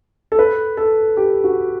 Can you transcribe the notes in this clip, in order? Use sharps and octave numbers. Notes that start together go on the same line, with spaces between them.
A4
B4
A4
G4
F#4